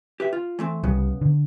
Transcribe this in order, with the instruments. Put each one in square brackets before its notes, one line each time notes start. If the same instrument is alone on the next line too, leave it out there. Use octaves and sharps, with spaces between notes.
[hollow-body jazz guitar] G4 B4 E5
F4
E3 A3 C4
[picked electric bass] C2 G3 [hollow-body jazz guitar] C#3 B3
[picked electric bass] D3